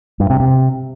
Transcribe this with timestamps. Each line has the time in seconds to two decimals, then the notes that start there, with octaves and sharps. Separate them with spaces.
0.20 G2
0.30 C3
0.40 C3